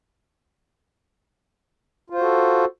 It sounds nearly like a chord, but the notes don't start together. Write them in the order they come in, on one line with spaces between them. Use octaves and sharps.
F4 C5 F#4 A4